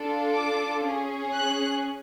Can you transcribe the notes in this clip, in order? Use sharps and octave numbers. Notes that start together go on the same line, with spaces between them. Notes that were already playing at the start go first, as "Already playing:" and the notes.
Already playing: D4 F4 A4
D6
C#4 G#4
F#6